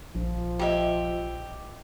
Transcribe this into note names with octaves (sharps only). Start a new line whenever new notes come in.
A#1 F3
F4 G4 D#5 E5